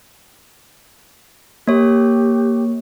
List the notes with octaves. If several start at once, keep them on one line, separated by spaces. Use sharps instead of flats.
A#3 G4 C#5